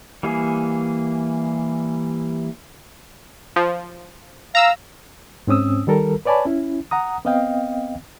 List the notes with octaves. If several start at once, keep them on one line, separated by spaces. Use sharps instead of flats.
E3 G3 A#3 G#4
F3
F5 A#5 E6
G#2 C4 C#4 D#6 E6
D#3 G3 A4 A#4
B4 C#5 D5 G#5 A5 B5
C#4 E4
F#5 A#5 D#6
B3 C4 D#5 F5 G5